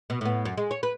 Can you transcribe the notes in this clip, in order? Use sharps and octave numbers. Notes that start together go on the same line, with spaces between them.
B2
A2 B3
F#2
G#3
C#5
B4